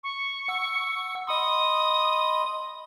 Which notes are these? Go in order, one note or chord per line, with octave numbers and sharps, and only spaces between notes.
C#6
F#5 E6
D#5 B5 C6 D#6